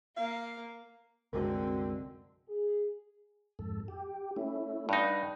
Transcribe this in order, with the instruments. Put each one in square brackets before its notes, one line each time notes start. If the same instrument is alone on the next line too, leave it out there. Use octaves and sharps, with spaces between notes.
[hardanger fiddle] A#3 [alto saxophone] F5
[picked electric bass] C2 F#2 G#3 [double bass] D3 C4 [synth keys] F#4 A#4
[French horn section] G#4
[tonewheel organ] F2 G#2 A4
G4
A3 C#4 E4
[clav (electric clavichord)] G2 D#4 [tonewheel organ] F#5